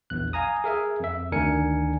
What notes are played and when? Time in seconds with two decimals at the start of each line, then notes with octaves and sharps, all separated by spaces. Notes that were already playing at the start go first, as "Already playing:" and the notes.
0.10 A#1 E2 F#6
0.33 F5 G#5 A#5 D#6
0.64 G#4 A#4 E5 G#5
1.00 F2 E5
1.32 D2 D#3 D4 A#4 G#5 C#7